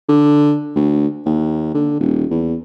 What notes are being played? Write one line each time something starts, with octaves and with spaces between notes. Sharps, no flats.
D3
D2
D#2
D3
D#1
E2